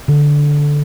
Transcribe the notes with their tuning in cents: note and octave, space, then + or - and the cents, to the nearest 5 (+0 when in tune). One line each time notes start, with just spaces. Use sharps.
D3 -5